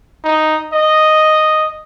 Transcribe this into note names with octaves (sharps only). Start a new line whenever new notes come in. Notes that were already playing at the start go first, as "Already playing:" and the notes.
D#4
D#5